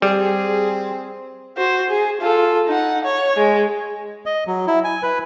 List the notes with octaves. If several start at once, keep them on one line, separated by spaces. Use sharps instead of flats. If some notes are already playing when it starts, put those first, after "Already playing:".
G3 C4 G#4
F#4 C5
G#4
F4 A4
D#4 F#5
C#5
G#3
D#5
F#3
E4
G#5
B4